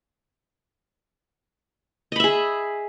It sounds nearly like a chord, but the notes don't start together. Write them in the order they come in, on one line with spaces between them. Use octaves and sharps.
D#5 B5 E5 G#4